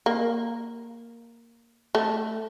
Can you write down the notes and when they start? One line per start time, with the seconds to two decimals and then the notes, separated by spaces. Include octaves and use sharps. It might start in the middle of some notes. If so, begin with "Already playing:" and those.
0.06 A#3
1.95 A3